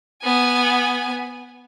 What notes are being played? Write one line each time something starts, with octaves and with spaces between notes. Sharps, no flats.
B3 G#5